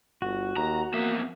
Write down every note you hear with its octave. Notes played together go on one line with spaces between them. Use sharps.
G1 F#4
D#2 A#5
F2 A#3 B3 E5